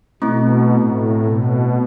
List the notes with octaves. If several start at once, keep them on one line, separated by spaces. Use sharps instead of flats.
B2 A3 C4 E4
A2
B2